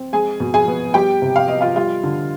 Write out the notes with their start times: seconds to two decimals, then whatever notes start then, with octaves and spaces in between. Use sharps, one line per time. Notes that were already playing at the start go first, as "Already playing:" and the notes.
Already playing: C4
0.13 G#3 G#4 G#5
0.40 B2
0.54 G#4 G#5
0.68 B3
0.94 G3 G4 G5
1.22 C3
1.36 F5
1.48 B3 D#5
1.61 F4 F5
1.76 G3 F4 F5
2.03 D3